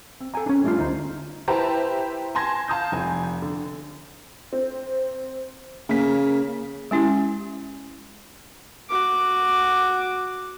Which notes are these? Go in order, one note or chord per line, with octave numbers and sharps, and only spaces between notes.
C4
A4 G5 G#5 A#5
C#4 D4
G3 A3 D4 E4 F4
D2 D#4 B4 C5
E4 G4 B4 C5 A5 A#5
G#5 A5 C6 G#6 A#6
F5 A5 D#6 G6
F1 G#5
D3
C4
C#3 A#3 B6
G#3 C#4 E4 G4
F#4 D6